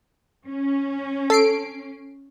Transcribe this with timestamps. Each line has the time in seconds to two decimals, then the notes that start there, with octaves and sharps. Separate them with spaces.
0.47 C#4
1.30 A4 C7 D7